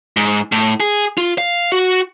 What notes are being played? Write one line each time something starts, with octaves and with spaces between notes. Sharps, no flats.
G#2
A2
G#4
F4
F5
F#4